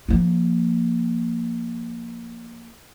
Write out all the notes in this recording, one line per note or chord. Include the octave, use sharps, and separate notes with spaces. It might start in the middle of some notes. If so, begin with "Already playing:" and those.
F3 A#3